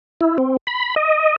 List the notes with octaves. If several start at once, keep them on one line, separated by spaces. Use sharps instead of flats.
E4
C4
B5
D#5